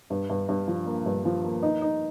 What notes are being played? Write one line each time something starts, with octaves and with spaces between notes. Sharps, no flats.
G2
G2
G2
F3
A#3
G2
F3
A#3
D#4
D#4